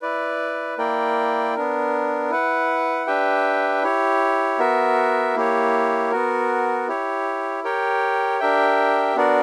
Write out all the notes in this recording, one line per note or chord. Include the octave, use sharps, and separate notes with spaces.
E4 B4 D5
A#3 E4 A#4 D5 G5
B3 D4 A#4
E4 B4 F#5
D4 G4 B4 E5 G5
E4 G4 C#5
B3 F#4 A#4 E5
A#3 E4 G4 C#5
B3 F#4 A#4
E4 G4 C#5
G4 A#4 C#5 G5
D4 G4 A#4 E5 G5
B3 D4 F#4 A#4 D5